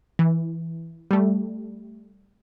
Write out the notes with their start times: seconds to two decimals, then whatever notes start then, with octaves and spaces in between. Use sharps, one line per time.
0.19 E3
1.11 G3 A3